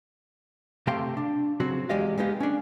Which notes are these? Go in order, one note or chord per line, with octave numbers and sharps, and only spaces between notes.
C3 A3 G4 F5 G5 C6
D4
C#3 F#3 C4 F#4
E2 G#3 G4 D5 D#5 F5
G#3 A#3 B3 D#4 G4 F5
C#4 D4